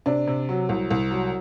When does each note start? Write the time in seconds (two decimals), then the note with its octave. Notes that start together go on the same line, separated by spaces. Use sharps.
0.06 C3 D4
0.27 C3
0.49 F#3
0.69 C2
0.91 C2
1.11 F#3